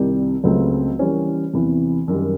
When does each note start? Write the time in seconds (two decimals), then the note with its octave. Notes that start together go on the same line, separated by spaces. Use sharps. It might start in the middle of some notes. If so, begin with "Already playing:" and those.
Already playing: C2 C3 D#3 G3
0.44 C#2 C#3 F#3 A3 C4
0.99 E3 G3 A#3 C#4
1.53 E2 C3 E3
2.08 F#2 D#3 G3